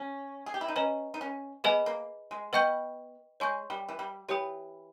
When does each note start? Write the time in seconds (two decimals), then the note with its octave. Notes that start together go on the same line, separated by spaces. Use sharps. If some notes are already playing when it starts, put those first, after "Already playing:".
Already playing: C#4
0.46 G#4
0.54 G4
0.61 E4
0.68 D#4
0.76 C#4 B4 D#5 A#5
1.14 D#4
1.21 C#4
1.64 B3 G#4 B4 D#5 G#5 B5
1.86 A#3
2.31 G#3
2.53 B3 B4 D#5 G5 C#6 G6
3.40 G#3 C#5 G#5 C#6 G6
3.70 G3
3.89 E3
3.99 G3
4.28 E3 G4 C#5 G5 B5 D#6